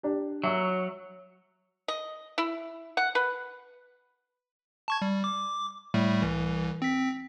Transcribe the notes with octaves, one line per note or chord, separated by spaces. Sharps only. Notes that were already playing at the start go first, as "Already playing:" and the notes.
D4 G4
F#3 E5 C#6 E6
D#5
E4
F#5
B4
A5 C#6 G#6
G3
D6
A2 G3 A3
C2 E3
C4 B6